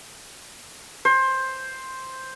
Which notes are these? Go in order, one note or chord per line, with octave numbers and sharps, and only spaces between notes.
C5